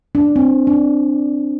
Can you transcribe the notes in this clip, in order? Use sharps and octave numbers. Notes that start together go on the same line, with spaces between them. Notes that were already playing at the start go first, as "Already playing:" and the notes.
D4
C4
D4